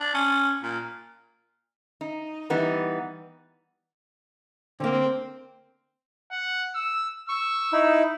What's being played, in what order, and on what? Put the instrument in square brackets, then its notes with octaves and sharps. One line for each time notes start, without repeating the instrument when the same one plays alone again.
[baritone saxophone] D4
C#4
A#2
[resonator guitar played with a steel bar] D#4
E3 G3 B3 D#4
[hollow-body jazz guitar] D3 A#3 [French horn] C4
[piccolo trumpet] F#5
E6
[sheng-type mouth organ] C#6 [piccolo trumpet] E6
[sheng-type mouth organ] D#4 E4